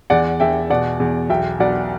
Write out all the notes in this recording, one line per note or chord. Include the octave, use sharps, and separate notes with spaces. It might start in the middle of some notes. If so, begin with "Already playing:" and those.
E2 D5 F#5
E2 E5 G5
B2 D5 F#5
E2
B1 E5 G5
B1 D5 F#5